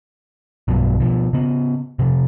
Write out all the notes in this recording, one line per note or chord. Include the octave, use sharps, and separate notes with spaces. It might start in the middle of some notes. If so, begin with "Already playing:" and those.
B1 G2 B2 F#3
B2 F3
C#3 B3
C3 F3